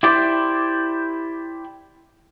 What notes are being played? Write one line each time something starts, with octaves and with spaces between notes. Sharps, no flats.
E4 G4 C5 D5